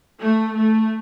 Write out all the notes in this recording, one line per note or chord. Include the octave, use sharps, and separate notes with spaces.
A3
A3